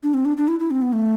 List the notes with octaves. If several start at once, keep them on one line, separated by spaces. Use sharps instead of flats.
D4
C4
D4
D4
E4
E4
C4
B3
A3